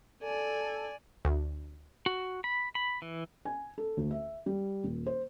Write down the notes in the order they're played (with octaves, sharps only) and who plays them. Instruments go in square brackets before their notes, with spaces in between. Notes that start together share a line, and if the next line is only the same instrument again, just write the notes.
[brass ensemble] A4 [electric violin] D5 G#5
[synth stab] D2
[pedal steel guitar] F#4
B5
B5
E3
[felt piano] G#5
A4
D2
E5
G3
D#1
C5